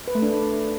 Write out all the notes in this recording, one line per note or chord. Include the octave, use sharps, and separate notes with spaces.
B4
A3
D4